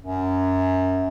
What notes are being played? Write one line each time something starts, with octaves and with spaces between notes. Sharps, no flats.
F#2